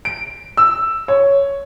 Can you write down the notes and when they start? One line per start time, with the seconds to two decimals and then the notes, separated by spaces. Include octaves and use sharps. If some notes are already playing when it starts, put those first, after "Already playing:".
0.05 D7
0.57 E6
1.08 C#5